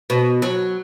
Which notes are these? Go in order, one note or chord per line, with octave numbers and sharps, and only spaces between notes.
B2
F#3